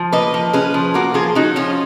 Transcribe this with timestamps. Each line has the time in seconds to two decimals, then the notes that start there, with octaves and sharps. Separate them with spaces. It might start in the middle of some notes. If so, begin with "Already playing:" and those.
Already playing: F3
0.12 A#3 B4 D#5
0.34 F3
0.53 C#4 G#4 B4
0.74 F3
0.94 A#3 F#4 A#4
1.14 F3 F4 G#4
1.35 C#4 D#4 F#4
1.56 F3 C#4 F4